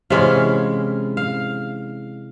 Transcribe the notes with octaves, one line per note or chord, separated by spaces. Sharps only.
C3 E3 G#3 C#4 F5
F5